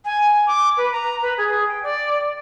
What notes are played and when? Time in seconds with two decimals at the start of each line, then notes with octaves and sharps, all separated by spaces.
0.05 G#5
0.47 D6
0.77 B4
0.92 A#5
1.22 B4
1.37 G#4
1.68 G5
1.83 D5